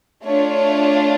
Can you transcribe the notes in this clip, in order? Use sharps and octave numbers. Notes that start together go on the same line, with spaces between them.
A3 D4 F4 C#5